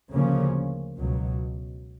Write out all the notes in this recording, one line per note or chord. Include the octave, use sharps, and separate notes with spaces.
D2 C#3 F3 A#3 C#4
C#2 B2 F#3